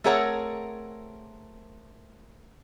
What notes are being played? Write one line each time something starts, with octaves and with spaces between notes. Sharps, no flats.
A3 C4 G#4 A#4 C#5 F#5